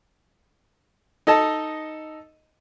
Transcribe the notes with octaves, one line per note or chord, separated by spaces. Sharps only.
D#4 A4 D#5 A5